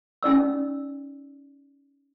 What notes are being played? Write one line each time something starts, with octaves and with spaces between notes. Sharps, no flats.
C#4 D#4 D5 E6